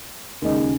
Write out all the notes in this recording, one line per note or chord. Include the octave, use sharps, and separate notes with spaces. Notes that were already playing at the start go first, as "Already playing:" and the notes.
D#2 C#3 G#3 D#4